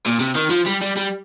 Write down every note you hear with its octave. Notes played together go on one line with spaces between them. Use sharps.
A#2
C3
D#3
F3
G3
G3
G3